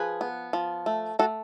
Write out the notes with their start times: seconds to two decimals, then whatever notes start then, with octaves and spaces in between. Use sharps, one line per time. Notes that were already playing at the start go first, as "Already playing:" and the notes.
Already playing: F3 G#4 B4
0.21 B3
0.53 F3
0.86 A3
1.19 A3 F#4 A4